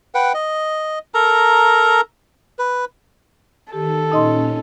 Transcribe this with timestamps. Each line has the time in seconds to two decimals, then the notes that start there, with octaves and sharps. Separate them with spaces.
0.15 B4 F#5 G5
0.34 D#5
1.14 A4 A#4 A#5
2.59 B4
3.73 D#3 G4 A4
4.12 A#2 C#4 D#4 D#5 C6